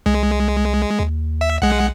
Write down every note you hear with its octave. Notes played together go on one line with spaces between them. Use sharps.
C2 G#3
D#2
E5
B1 G#3 F#5